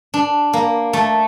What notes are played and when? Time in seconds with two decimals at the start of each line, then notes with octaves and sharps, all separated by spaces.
0.14 D4
0.53 A#3
0.93 A3